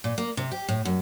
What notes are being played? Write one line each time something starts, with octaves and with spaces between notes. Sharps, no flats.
A#2
A#3
C3
G4
A2
F#2